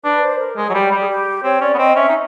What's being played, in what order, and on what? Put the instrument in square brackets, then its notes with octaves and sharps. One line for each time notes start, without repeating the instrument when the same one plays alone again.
[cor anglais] D4 [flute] B4
[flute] C5
A#4
[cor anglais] G#3 [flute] G#4
[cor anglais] F#3
[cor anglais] G3 [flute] G4
[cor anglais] G3
[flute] G#4
G4
[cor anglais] C4 [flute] C#5
[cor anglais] C#4 [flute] D5
[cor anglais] B3
[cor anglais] C4 [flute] D#5
[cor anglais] C#4 [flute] E5
[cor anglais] D#4